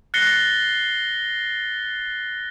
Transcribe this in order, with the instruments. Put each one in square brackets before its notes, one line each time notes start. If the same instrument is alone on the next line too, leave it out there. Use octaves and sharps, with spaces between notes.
[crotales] F#6 A6 A#6 C7 C#7 G7